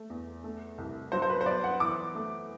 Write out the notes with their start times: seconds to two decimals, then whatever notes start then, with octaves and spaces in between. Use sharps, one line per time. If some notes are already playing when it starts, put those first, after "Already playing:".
Already playing: A3
0.10 E2
0.44 A3
0.78 C2
1.12 F#3 C5
1.22 C5
1.30 B4
1.41 C5
1.46 B3 D5
1.64 F#5
1.80 E3 D6
2.15 A3